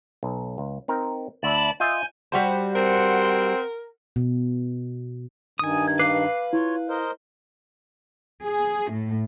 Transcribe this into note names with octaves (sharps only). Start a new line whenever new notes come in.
B1
C#2
C4 D#4 A#4
D2 D5 E5 A5 B5
F4 D#5 E5 G#5 G6
G3 F#4 C5
C4 A#4 F#5 C6
B2
G2 D#3 G#5 D#6
G#6
B4 F5 D6 F#6 C7
E4 F4 C#5
A#4 C5 D#5
G#4
A2